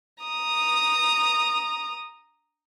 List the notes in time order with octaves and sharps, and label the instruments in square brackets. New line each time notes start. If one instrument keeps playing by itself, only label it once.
[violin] A#5 D#6